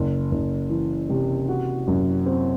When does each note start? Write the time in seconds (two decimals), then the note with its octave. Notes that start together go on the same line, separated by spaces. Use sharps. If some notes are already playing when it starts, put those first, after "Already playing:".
Already playing: F#1
0.31 F#1
0.70 E3
1.09 C3
1.48 F#4
1.87 F#2
2.26 C4